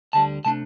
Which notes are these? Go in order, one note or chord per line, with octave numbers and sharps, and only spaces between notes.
D2 D3 G3 A5
C3 A3 D4 A5